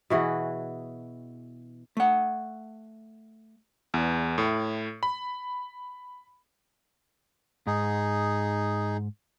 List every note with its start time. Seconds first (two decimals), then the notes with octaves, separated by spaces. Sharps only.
0.10 B2 E3 F#4 G#4
1.97 A3 F#5
3.94 E2
4.38 A2
5.03 B5
7.67 G#2 D#4 G#4